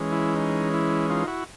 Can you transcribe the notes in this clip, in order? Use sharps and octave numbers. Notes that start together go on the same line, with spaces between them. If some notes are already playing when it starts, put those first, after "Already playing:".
Already playing: E3 G#3 C#4
E4
D#4
E4
D#4 F4
E4 F#4